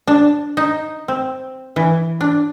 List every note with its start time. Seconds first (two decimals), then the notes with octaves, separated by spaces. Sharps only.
0.07 D4
0.57 D#4
1.08 C4
1.76 E3
2.21 D4